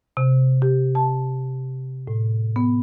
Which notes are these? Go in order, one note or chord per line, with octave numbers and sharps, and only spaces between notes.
C3
G4
A5
A2
B3